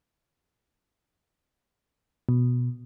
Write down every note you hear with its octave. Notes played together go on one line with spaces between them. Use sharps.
B2